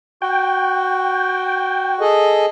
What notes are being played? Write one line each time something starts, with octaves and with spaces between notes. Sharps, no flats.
F#4 G5
G#4 A4 D#5